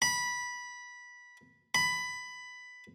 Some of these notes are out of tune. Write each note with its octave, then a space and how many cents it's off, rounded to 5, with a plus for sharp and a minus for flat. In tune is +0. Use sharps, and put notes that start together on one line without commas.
B5 -15
B5 +10